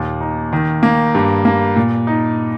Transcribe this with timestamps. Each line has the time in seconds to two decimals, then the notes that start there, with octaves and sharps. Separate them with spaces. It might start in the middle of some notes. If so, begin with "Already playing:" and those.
Already playing: D#2 A#2
0.21 D#4
0.53 D#3
0.83 A#3
1.15 G2
1.45 A#3
1.76 A#2
2.07 D#4